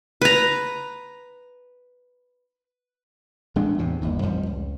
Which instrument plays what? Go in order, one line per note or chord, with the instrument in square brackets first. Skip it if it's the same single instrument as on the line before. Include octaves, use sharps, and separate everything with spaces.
[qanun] B4 A#5
[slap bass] A1 G#3 A3 D4
E2 A2 C3
G1 D#2 A2
A1 F2 F3 G3
C#2